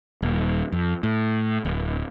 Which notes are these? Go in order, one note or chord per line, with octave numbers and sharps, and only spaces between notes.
D#1
F2
A2
D1